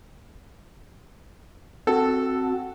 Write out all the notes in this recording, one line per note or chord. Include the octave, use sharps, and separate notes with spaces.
C4 F#4 A4